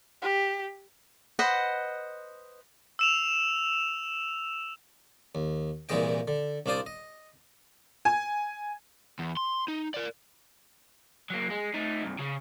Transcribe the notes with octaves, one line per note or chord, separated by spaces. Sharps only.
G4
B4 C5 D#5 F#5
E6 E7 F7
D#2
C2 A#2 E3 G#3 D#5 G5
D3
C2 D4 F4 C5 D5 D#6
D#5
G#5
E2
C6
D#4
A#4 D5
F#3 A#3
G#3
A3 D#4
C2 G2
C#3